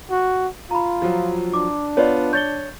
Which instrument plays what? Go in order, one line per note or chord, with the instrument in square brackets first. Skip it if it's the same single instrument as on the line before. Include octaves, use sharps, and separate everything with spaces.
[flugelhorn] F#4
[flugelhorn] F4 [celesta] A#5 B5
[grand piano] F3 F#3
[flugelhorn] D4 [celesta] D6
[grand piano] B3 F4 [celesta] C#5 D5
[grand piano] C#5 [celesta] G6 A6 G7